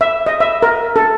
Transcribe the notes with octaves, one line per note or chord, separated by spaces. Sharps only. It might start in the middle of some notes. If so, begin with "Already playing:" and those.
E5
D#5
E5
A#4
A4